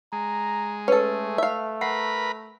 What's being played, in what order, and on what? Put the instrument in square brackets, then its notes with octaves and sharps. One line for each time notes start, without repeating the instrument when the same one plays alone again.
[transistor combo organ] G#3 [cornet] A#5
[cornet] A3 [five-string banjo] C#4 A4 [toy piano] B4
[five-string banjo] E5 F5
[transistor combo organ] A#4 B4 B5 [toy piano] F#5